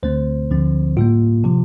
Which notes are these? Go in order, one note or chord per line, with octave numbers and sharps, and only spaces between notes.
D2 D3 A3 C4 C5
D2 D3 F3 C4
A2 G3 A#3 F4
C3 F3